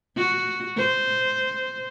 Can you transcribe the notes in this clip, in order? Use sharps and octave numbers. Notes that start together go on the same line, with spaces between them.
F#4
C5